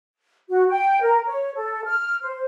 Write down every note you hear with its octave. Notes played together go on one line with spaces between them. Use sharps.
F#4
G5
A#4
C#5
A4
F6
C5